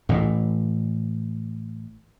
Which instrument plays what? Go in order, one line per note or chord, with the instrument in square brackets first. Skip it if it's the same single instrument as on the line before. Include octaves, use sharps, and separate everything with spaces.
[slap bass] A1 A2